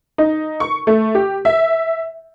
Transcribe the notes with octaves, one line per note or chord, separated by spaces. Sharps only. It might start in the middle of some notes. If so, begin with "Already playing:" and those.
D#4
C#6
A3
G4
E5